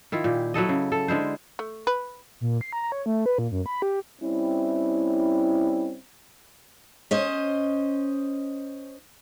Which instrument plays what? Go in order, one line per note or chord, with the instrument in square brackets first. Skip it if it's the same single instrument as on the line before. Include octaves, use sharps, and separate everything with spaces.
[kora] D#3 E4 F4
A#2 G4
F#3 E4 A4 D#5
C#3
A4
D3 G#3 E4 C5
[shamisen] A3
B4
[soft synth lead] A#2
C7
A#5
C#5
A3
B4
A#2
F#2
B5
G4
[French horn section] G3 C4 C#4 E4
[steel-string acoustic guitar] C#4 C5 D#5